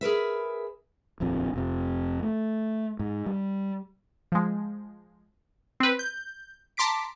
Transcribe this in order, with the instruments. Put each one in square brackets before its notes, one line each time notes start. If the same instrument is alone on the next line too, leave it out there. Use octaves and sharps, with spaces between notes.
[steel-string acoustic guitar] G#4 A#4 B4 E5
[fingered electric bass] D#1 A#1 F2 C4
F1 F2 C3
A3
G#2
G3
[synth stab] F3 G#3
C4 B4
G6
A5 A#5 C6 D6 B6 D7